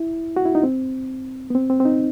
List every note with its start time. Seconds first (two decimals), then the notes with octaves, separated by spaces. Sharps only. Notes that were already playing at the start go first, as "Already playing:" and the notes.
Already playing: E4
0.36 F#4
0.45 E4
0.55 D#4
0.63 C4
1.50 B3
1.55 C4
1.70 C4
1.80 C4
1.85 D#4